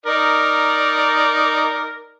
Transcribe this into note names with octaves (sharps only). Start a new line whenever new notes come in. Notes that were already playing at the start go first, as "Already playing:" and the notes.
D#4 A#4 D5